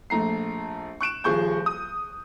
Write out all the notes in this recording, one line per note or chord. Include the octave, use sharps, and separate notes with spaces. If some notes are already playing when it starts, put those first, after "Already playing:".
A#1 A3 A#5 C7
C#6 F#6 D7 E7
D#1 F3 G#4 C#6 G6
D#6